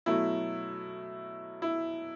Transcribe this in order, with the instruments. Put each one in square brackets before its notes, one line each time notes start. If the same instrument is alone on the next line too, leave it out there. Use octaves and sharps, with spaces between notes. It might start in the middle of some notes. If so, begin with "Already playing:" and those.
[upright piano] B2 F#3 A3 E4
E4